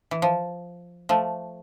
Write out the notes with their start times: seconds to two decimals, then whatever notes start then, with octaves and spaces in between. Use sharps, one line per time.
0.11 E3
0.22 F3
1.09 F3 A3